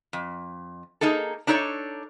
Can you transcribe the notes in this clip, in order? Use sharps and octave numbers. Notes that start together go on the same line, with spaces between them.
F2
A#3 D#4 G#4 A4
D4 D#4 A4 C#5 D5